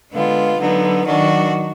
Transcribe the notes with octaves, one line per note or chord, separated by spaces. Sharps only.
D3 G#3 B3 F4
D3 F#3 B3 D#4
D#3 F#3 D4 F#4